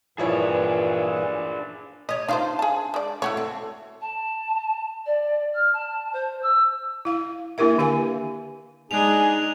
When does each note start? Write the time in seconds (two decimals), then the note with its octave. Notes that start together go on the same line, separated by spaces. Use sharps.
0.18 G2 A#2 E3 F3 D4 E4 G#4 C#5
2.09 G4 C#5 D#5
2.28 D4 D#4 F4 C5 F5
2.59 G#4 A5
2.94 G#3 D5
3.22 A3 E4 F#4 C#5
3.37 C4
4.01 A5
5.06 D5
5.54 F6
5.73 A5
6.13 C5
6.42 E6
7.05 E4 F5
7.58 A#3 D4 E4 G4 A#4 E5
7.78 D3 G4 F5 G#5
8.91 G#3 D4 D#4 G#4 G#5 F#6 F7